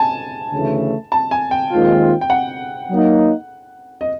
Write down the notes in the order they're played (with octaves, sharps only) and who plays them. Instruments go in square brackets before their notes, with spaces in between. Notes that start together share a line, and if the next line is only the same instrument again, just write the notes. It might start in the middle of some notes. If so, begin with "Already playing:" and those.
Already playing: [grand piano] G#5 A5
[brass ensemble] D2 C#3 E3 A3
[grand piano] A5
G#5
G5
[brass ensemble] D#2 D#3 G#3 C4 F4
[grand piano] G5
F#5
[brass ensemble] F#3 A#3 D#4
[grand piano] D#5